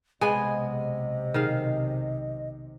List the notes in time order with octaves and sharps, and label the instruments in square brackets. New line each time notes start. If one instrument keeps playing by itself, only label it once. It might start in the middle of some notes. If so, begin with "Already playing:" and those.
[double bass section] B1 C3 [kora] G#3 B3 [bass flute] D#5 [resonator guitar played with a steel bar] G#5
[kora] D#3 G#4 F5